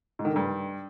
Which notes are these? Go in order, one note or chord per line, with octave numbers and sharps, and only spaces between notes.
G#2
D#3
D3
G2